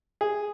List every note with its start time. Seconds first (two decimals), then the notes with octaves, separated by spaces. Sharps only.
0.21 G#4